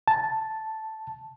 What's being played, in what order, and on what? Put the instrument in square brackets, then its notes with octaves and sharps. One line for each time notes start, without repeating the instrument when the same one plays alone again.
[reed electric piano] A5